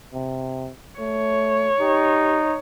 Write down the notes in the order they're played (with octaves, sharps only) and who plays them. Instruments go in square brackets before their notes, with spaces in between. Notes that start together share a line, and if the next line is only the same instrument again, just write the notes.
[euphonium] C3
[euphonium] A3 [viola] C#5
[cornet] D#4 [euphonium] G4